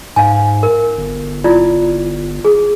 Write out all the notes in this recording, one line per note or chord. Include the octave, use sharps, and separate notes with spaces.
G#2 F5 G#5
A#4
G1
E4 F4 D5
G#4